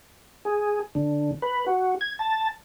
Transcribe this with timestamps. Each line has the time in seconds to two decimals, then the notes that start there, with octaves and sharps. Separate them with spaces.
0.45 G#4
0.95 D3
1.42 B4
1.67 F#4
2.01 G#6
2.19 A5